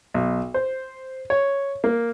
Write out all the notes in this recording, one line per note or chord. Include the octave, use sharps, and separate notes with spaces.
B1
C5
C#5
A#3